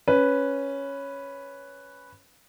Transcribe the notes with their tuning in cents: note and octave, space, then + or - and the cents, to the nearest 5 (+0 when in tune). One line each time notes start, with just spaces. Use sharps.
C#4 +0 B4 +0